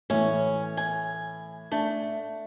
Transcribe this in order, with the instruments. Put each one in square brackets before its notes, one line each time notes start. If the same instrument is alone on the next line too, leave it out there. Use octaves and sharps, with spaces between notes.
[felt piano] A2 E3 [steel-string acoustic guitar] C#4
[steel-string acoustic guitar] G#5
[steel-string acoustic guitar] A3 [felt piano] D4